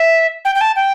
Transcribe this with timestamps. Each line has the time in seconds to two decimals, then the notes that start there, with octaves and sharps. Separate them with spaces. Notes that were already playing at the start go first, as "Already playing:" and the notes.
Already playing: E5
0.45 G5
0.55 G5
0.61 A5
0.76 G5